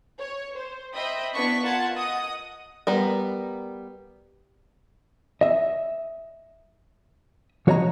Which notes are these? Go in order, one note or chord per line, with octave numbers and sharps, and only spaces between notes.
C#5
C5
C5 D#5 E5 G5 B5 D#6
B3 D4 E4 C#6 B6
F4 A#4 F#5 A5 G#6
D#5 F#5 D#6
G3 B3 A#4
D#5 E5
F3 F#4 C#5 D#5 F5 A#5